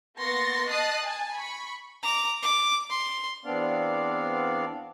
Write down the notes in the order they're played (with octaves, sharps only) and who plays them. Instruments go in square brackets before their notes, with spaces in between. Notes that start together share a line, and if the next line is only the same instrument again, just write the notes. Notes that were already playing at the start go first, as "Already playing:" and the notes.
[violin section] A#3 B3 C6 C#6 A6 A#6
D#5 A5 D#6 F#6 A6 C7
G#5 A5
B5 C#6
[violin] A#5 D6
D6
C6
[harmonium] E2 B3 C4 D4 D5 F5